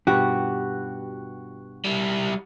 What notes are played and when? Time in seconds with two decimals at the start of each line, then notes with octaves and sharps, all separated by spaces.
0.07 G2 B2 F#4 G4
1.85 G3 E4